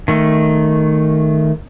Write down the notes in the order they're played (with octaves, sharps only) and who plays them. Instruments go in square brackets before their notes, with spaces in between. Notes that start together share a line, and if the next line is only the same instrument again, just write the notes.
[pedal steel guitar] D#3 A3